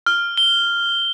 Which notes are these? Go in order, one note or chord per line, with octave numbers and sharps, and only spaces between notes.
F6
G7